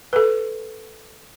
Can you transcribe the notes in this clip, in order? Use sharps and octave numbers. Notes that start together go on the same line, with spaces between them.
A4 B4